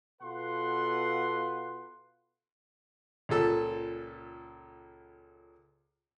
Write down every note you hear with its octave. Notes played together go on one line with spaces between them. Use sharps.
B2 F4 A4 B4 F#5 C6
C#2 A#2 A4 E6